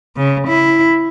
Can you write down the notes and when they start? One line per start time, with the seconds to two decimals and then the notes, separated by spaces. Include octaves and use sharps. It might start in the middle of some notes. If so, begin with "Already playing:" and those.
0.16 C#3
0.48 E4